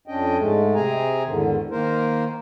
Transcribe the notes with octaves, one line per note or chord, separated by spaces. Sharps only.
F2 C#4 D4 D#5 G5
G#2 G#3 A3
C3 C4 G#4 G#5 A#5
E2 G#2 D3 D#3
D#3 A#3 A#4 C5